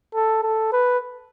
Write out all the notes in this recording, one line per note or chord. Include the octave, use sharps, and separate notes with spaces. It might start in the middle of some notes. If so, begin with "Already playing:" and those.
A4
A4
B4